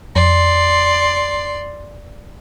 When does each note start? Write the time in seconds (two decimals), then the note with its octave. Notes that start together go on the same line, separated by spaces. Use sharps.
0.16 F2 D5 C6